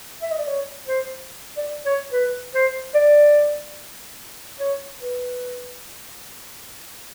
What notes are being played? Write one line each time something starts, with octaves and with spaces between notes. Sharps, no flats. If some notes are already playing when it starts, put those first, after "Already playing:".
E5
D#5
D5
C#5
C5
D5
C#5
B4
C5
D5
C#5
B4